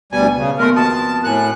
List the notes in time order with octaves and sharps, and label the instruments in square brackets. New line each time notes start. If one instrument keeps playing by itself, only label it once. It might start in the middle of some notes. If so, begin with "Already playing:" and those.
[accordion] D2 G3 G#5 [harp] B2
[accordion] C#3
[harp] D#2 B3 C6 [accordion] A3 A#4
[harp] F2 F#4 D#6 [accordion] A5
[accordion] A2 F#6 [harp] A#4 F#5 G#5